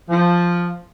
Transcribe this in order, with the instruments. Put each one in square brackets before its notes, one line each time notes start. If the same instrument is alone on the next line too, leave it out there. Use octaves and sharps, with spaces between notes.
[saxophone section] F3